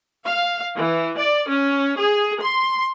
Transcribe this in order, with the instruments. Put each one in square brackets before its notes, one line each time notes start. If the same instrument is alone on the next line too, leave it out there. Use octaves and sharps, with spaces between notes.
[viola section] F5
E3
D5
C#4
G#4
C6